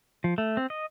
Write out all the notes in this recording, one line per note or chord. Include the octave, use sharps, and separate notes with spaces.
F3
A3
C4
D#5